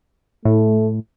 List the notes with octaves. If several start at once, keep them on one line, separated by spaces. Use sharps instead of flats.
A2 A3